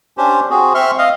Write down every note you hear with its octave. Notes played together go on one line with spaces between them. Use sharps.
C#4 D4 G4 C5
C4 F#4 G#4
C4 E5 C6 C#6 F6
D#5 F5